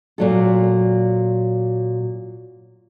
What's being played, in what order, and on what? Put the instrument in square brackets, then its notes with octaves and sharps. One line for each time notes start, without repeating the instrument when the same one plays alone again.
[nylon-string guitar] A#2 F#3 A4